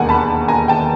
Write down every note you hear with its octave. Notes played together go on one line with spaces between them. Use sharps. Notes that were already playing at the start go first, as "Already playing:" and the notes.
Already playing: E1 D#2 D#3 F#5 G#5
A5 B5
G#5 A#5
G5 A5